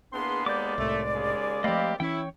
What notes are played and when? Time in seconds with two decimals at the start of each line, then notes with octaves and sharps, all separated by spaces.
0.13 E2 A#3 B3 D4 G#4 C6
0.46 D#2 G#3 D5 D6 G6
0.78 C2 A2 A3
1.13 C#3 G#4
1.64 F3 A3 A#3 C4 G4 D#5 F5 B5
2.00 E3 C#4 E4 C#5 G5